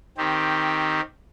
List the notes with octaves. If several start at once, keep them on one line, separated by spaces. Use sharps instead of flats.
D#3 C4 G4